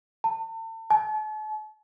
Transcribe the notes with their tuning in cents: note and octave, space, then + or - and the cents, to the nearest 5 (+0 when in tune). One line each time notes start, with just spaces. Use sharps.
A5 +40
A5 -40